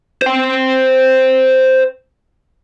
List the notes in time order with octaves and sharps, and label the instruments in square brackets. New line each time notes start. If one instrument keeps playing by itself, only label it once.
[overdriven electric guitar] C5 G5